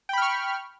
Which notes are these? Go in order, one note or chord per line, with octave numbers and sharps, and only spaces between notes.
G5 B5 C#6 F6